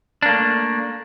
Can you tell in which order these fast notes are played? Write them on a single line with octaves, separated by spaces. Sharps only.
D4 A#3 A3